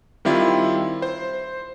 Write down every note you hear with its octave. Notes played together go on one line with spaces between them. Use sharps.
D#3 G3 C4 E4 F4
C5